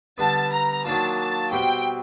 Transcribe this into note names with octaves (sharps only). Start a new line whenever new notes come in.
D3 G3 B3 A5
A#5
D#3 F#3 A#3 D4 F4 A5
A5
B2 G3 C4 G5